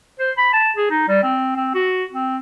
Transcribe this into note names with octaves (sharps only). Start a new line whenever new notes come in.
C5
B5
A5
G#4
D#4
G3
C4
C4
F#4
C4